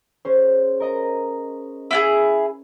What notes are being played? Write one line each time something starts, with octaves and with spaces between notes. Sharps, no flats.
C#4 G#4 C5
A#4 D#5 A#5
E4 F4 G#4